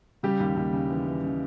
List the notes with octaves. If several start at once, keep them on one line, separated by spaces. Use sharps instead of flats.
C#3 G3 G4
D#2
D#2
C#3
E3
E3
C#3